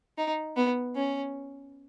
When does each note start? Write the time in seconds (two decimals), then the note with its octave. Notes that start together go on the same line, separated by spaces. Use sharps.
0.18 D#4
0.57 B3
0.96 C#4